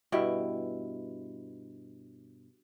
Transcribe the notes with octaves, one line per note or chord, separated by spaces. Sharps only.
G2 B2 E4 G5